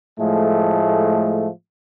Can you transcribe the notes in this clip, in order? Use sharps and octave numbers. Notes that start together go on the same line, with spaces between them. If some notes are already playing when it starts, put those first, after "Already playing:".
A2 F3 G#3 A3